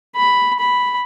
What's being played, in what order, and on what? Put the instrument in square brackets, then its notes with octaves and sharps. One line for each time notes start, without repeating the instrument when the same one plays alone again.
[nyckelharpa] B5
B5